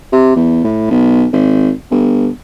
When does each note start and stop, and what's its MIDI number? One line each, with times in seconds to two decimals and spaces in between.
0.12 0.34 48
0.36 0.64 40
0.64 0.88 45
0.91 1.25 35
1.32 1.71 32
1.91 2.29 31